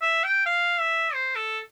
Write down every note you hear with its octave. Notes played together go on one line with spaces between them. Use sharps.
E5
G5
F5
E5
C5
A4